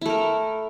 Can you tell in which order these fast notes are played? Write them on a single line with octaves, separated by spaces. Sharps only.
E4 A3 A#4